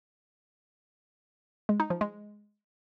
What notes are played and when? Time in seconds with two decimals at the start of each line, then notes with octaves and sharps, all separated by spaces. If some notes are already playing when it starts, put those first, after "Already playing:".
1.69 G#3
1.80 D#4
1.90 F3
2.01 G#3